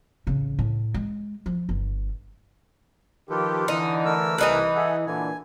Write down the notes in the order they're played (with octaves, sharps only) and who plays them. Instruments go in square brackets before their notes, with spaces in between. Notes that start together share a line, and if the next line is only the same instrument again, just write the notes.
[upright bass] A1 C#3
A2
G#3
F3
G1
[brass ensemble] D#3 F3 G4 [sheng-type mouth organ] F4 A4 B4
[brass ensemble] D3 E3 [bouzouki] D#4
[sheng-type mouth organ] A3 A#4 E6
[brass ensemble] C2 [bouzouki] E3 D#4 B4
[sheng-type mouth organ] G#4 A4 [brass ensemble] E5 F#5
[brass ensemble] A#2 D3 E3 [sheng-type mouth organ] G#5